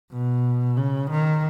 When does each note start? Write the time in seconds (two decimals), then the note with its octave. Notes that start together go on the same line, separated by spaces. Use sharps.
0.12 B2
0.77 C#3
1.10 D#3